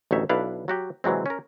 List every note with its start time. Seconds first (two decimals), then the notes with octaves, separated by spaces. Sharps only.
0.11 A1 D2 D#4 C#5 E5
0.29 B1 D4 E4 B4 F5
0.68 F#3 F#4 G4
1.04 C3 E3 F#3 G#3 C4
1.26 C#4 A#4